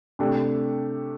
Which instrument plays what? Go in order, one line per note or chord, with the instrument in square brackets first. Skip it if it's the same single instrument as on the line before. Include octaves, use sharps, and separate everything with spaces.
[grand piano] C3 A3 D4 G4